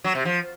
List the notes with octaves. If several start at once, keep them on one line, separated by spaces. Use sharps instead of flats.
F#3
C3
F3